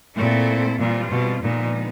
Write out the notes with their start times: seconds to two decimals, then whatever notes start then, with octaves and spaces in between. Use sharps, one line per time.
0.15 A#2 A3 C4 E4 A4
0.78 A#2 E3 G3 C4 F4
1.11 B2
1.42 A#2 D3 F3 G#3 B3 D#4